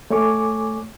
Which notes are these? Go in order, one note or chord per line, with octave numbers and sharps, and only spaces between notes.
A3 C#5 G#5 C#6 D6